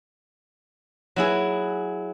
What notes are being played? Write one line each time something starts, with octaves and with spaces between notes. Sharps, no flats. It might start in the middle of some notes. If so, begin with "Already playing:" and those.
F#3 E4 G#4